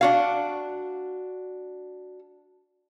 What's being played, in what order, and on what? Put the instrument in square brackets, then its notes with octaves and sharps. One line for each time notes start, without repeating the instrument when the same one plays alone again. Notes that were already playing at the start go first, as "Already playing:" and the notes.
[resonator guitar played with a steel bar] D4 F#4 F5